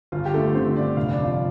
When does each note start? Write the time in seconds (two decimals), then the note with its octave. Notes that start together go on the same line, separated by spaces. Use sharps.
0.12 G1 F4
0.25 G4
0.34 D3 A3 A4
0.54 G1 C4 C5
0.76 G1 D4 D5
0.97 F1 F5
1.11 D5
1.18 F2
1.24 F4 F5